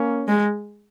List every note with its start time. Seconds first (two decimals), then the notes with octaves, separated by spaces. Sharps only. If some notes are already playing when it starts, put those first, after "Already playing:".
Already playing: A#3 C#4
0.28 G#3